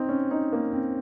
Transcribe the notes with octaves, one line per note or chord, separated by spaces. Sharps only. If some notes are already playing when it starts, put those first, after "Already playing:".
Already playing: C4 D#4
C#4
D#4
A#3
C4